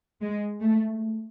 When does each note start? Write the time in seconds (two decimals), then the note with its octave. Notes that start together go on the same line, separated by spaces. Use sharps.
0.22 G#3
0.62 A3